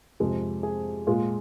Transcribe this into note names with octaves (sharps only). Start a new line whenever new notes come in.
F2 C3 G#3
G#4
A#2 G#3 F4